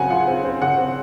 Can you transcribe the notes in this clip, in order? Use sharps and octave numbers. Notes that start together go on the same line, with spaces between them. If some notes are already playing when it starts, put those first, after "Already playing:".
Already playing: C#3 F#3 C4 F#5 G#5
F4 F#5
C4
C4
C#3 F#5
C4